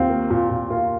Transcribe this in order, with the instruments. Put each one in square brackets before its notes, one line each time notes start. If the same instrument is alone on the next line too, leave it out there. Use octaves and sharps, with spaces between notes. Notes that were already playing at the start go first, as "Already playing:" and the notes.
Already playing: [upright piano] D#2 [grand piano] C4 F4
[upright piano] A#3
A#2
A#2
[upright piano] A#2 [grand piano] F4 A#4